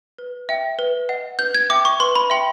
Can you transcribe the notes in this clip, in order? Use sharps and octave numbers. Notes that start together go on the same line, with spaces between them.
B4
E5 G5
B4
D#5 F#5
B4 G6
G#6
E5 G5 D6
C#6
B4 C6
B5
E5 G5 C6